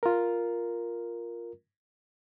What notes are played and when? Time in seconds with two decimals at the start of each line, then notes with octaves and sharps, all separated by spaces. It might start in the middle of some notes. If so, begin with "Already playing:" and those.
0.03 F4 A#4